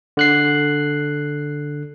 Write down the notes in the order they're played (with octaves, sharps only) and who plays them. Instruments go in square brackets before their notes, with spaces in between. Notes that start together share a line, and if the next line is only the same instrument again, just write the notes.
[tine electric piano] D3 F#6 C7